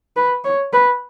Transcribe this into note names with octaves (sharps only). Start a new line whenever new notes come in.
B4
C#5
B4